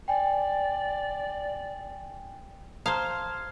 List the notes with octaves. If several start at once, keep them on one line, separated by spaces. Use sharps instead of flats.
D5 G5 G#5
C5 F5 A5 A#5 D#6 F6 G#6